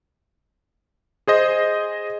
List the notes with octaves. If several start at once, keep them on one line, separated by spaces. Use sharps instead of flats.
G#4 C5 D#5